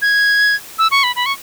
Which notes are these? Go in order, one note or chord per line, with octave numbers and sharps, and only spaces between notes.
G#6
E6
C#6
B5
B5
C#6